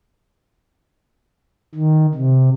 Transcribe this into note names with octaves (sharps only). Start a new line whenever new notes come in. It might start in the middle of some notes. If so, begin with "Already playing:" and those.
D#3
C3